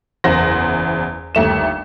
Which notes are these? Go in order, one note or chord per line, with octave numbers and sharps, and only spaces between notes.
F#1 E2 C5 F#5 C6 A#6
G1 D#2 A3 E7